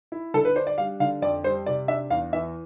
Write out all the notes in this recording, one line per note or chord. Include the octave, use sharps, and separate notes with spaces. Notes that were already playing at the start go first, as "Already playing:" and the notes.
E4
D3 A4
B4
D4 C5
D5
G3 F5
D3 F5
F2 D5
G3 C5
C3 D5
D4 E5
E2 F5
E3 E5